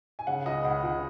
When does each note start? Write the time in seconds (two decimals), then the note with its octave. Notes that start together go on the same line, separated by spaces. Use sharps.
0.19 G#5
0.27 C#3 F#5
0.46 C#2 D#5
0.65 C#2 F#5
0.83 C#2